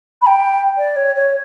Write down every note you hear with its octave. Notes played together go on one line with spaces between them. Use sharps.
B5
G5
D5
C#5
C#5